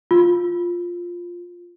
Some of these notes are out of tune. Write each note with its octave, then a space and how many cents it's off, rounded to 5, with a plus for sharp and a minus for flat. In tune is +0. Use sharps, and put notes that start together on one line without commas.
F4 +5